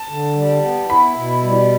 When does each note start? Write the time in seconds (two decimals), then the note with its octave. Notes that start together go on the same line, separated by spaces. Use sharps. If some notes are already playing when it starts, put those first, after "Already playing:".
Already playing: A5
0.09 D3
0.35 G3
0.63 B3
0.89 E4 B5
1.16 B2
1.43 G3